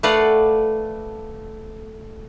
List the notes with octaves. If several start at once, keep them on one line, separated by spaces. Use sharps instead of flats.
A3 B4 D5 F5 F#5 B5